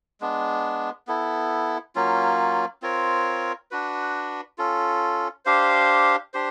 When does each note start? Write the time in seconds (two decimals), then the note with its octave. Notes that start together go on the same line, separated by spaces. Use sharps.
0.21 G#3 B3 D4
1.07 B3 E4 A4
1.95 F#3 A#3 C#4 F4
2.82 C4 F4 A#4 C#5
3.71 D4 F#4 B4
4.58 C#4 F4 A4
5.45 D4 G4 C5 F5
6.34 D4 G4 C5